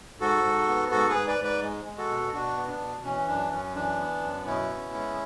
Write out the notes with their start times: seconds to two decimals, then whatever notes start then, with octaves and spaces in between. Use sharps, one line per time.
0.20 G#2 F#4 A4
0.44 G#2
0.68 B3
0.91 G#2 F#4 A4
1.09 G#4 B4
1.15 G#2
1.27 B4 D5
1.38 G#2
1.44 B4 D5
1.62 G#3
1.85 G#3
1.98 F#4 A4
2.10 B2
2.33 B2 D4 F#4
2.57 B3
2.68 D4
2.80 B2
3.04 E3 C#4
3.28 F#2 D4
3.51 F#2 C#4
3.75 E3 D4
3.99 B3
4.23 F#2
4.46 B2 C#4 E4
4.70 B3
4.94 G#3